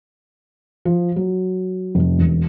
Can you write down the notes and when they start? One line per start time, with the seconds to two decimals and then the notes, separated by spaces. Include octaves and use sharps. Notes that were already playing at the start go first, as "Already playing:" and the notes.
0.85 F3
1.16 F#3
1.95 F1
2.19 E1